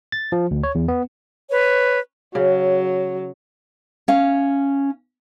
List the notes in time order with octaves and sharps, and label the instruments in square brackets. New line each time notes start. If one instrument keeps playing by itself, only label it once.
[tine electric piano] A6
F3
D2
C#5
E2
B3
[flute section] B4 C#5
[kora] C#3 [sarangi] F#3
[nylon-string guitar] C#4 F5